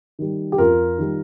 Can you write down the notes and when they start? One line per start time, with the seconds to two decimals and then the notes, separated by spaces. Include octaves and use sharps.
0.19 D#3 G3
0.52 G4
0.58 F2 F4 A#4
0.98 D#3 G3